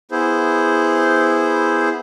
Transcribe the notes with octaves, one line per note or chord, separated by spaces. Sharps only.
B3 E4 G#4 C5